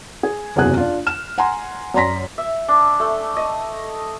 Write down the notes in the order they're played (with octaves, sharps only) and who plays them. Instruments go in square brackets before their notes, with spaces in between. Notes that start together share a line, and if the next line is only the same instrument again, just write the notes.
[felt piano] G#4
F#1 E2 C3 F#3 G#4 F#6
D4 F4
F6 E7
F#5 G#5 A#5 C6
F#2 D5 A#5 C6 A#6 B6
[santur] E5
D4
A3
D#5